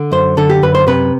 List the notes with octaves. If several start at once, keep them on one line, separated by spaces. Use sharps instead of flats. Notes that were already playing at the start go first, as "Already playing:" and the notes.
Already playing: D3
F#2 C5
D3 A4
G4
F#2 B4
C5
C3 B4